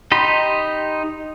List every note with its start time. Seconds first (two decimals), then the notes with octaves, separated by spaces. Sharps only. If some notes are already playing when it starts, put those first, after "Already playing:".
0.12 D#4 G4 B5 C6